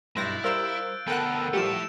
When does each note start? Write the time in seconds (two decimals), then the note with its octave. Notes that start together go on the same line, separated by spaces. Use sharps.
0.17 B1 G2 E4 C6 F#6 G6 A6 A#6
0.44 G3 A#4 C5 F5 E6 D7
1.08 D2 B3 A4 A#4 F#5 G5 A5 F#6
1.53 F3 G3 A3 E4 G4 C#7 E7